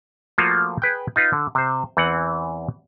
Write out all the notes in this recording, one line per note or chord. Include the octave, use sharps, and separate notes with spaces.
F3 A3 A#3 F4 F#4
G#4 B4 G5
D#4 F4 B4
D3
C3 C5
E2 E3 C4 F#5